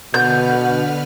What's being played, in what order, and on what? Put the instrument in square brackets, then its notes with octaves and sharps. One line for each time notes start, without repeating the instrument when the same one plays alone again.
[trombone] B2 [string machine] D3 B4 F6 [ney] F#5 [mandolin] G6